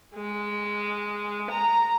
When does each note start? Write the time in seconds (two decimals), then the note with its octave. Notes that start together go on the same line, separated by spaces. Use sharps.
0.15 G#3
1.50 A#5